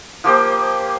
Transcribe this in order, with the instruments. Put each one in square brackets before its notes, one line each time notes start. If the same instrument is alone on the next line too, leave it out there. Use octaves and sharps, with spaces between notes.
[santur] F3 A#3 G4 C5